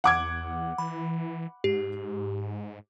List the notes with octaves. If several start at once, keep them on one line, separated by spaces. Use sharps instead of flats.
E2 F#5 D6 G#6
E3 B5
G#2 G4